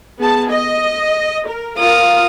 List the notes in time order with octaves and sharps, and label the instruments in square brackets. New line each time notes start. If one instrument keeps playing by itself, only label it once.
[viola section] B3 G#4 A5
D#5
A#4
[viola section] F4 A#4 [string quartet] F5 D#6